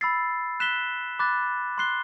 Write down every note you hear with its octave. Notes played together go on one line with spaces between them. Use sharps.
B5 E6 A6 C7
F#6 B6 E7 G7
B5 D6 F#6 A6
C6 F#6 C7 G7